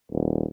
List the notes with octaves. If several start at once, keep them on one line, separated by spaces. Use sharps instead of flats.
D#1